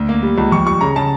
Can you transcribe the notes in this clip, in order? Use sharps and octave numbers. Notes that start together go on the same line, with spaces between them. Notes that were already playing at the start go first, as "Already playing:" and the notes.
Already playing: D2
A#3
G3
C#2
F2 C#6
G3 C#6
C#3 A#5
C#3 A5